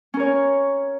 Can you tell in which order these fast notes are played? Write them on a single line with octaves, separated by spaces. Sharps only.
C#4 A#4 C#5